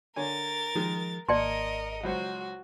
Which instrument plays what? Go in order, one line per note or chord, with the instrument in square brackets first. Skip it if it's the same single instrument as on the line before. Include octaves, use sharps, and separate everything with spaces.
[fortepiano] D3 C#5 G#5 [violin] A#4 A6
[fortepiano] D#3 G#3 [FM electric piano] F3
[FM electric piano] G#1 C#7 [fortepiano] A#3 [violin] A#4 D#5 [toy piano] D5 A5 C6
[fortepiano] C#2 F#3 C5 [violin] F#4